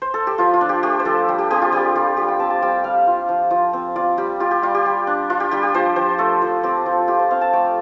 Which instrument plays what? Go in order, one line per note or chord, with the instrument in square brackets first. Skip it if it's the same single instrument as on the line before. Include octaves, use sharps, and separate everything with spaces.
[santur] C5
A4
G4
F3 F4
F4
D4
G4
A3 G4
C5
F3 A4
G3
G4
C4 G4
F4
G3 G4
G3 F4
G3 G4
G5
C4 A5
A5
G3 G5
G3 F5
F4
F3
F3
C4
F4 D5
G3 G4
F4 G4
G4
G3 F4
G4
G3
D4
D4 F4
G4
G3 G4
G4
F3 C5
F3 C5
A3 A4
F3
C4 G4
F3
F4 G4
C5
C4 F5
A5
A3 G5